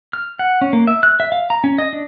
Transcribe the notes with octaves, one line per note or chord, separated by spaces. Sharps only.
F6
F#5
C#4
A#3
E5
F#6
E5
F5
A#5
C#4
D#5
D4